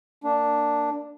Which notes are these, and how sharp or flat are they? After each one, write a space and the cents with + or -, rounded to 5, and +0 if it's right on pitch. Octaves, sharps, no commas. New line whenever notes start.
A#3 -20 D4 +0